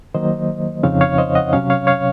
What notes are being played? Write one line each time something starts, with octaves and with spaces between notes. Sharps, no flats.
D#3 F#3 A#3 C5 D#5
F2 C#3 F3 C4 D#4 C#5 F5
C#5 F5
C5 D#5
D#5 F#5
C3 F#3 C#4 C#5 F5
C#5 F5
C#5 F5